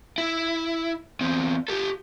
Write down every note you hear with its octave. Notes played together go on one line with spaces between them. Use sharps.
E4
E2 C4
G4 A4